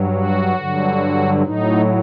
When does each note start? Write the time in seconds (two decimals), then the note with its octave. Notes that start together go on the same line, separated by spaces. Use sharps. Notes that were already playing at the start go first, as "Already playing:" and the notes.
Already playing: G2 F#3
0.13 F#4
0.57 G2 D3 F#3
1.43 A2 F#3 D#4